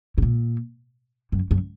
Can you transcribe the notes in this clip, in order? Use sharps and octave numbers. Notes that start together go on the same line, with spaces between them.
G#2
A#2
F#2
F#2